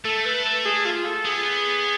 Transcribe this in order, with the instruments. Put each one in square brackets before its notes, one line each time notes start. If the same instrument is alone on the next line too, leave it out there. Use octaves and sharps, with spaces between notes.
[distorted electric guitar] A3 [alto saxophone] A4
[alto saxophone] B4
G#4
F4
A4
[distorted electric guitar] B3 [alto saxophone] G#4